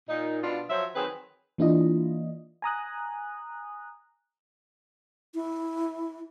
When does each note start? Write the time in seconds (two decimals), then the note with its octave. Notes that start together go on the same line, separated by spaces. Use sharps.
0.09 A#2 D#4
0.43 B2 D4 F4
0.69 F3 F#3 C5 C#5 E5
0.96 D#3 F#3 C4 G#4 B4
1.58 E3 A#3 D4 E4 F4 D#5
2.62 G#5 A#5 D#6 F#6
5.35 E4